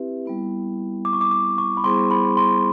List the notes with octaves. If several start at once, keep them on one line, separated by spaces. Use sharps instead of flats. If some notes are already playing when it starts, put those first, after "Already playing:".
Already playing: C4 E4 G4 B4 E5
G3 B3 E4
D6
C#6
D6
D6
C#6
B5
G3 B3 E4 G#4 C5 C6
B5
C6